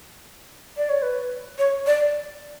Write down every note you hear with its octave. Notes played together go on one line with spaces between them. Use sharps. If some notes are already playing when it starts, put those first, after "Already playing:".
D5
C#5
B4
C#5
D5